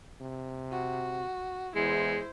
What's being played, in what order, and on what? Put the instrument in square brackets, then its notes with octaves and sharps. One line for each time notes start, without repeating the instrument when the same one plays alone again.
[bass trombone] C3
[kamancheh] F#4
[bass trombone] E2 [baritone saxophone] G#3 [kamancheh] E4 C5